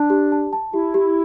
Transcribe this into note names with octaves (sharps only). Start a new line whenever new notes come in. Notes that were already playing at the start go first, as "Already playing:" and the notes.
Already playing: D4 A5
G4
A5
A5
E4 G4
G4